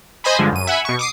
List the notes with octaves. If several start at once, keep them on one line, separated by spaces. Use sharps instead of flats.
C5 D#5 G#5 B5
G2 D3 F3 G#3
F#2 D#7
E5 F#5 G#5 B5
B2 C#6
D6 D#6 C7